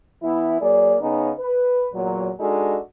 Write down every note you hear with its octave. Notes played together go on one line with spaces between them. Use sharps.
E3 B3 E4
F#3 A#3 G#4 D5
C#3 B3 C#4 D#4
B4
E2 A#2 F#3
G#3 D4 D#4 F#4 A4